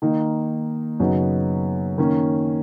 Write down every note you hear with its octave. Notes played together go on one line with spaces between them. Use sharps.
D#3 A#3 D#4
F#2 C#3 F#3 B3 D#4
D#3 A#3 C#4